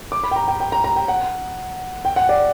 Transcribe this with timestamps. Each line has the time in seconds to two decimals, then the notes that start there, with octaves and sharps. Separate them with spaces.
0.12 D6
0.24 B5
0.31 G5
0.36 A#5
0.48 G5
0.60 G5
0.72 A#5
0.84 A#5
0.96 G5
1.08 F#5
2.05 G5
2.16 F#5
2.29 D5